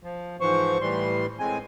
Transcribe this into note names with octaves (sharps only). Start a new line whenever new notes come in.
F3
G#2 E3 F3 C5 C#6
A2 E3 G3 C6
A2 G#3 C4 G#5